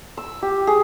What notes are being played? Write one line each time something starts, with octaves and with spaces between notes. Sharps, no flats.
E6
G4
G#4